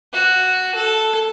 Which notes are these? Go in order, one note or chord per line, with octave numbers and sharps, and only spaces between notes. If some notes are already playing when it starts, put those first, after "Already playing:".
F#4
A4